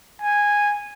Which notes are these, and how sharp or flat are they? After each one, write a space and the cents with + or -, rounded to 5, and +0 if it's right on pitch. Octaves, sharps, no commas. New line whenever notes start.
G#5 -10